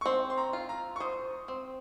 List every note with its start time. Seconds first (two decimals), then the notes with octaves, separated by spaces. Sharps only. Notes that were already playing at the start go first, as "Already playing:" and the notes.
0.01 C#6
0.06 C4 C6
0.30 C6
0.38 A#5
0.53 F4
0.69 A#5
0.96 C#6
1.00 C5 D#6
1.48 C4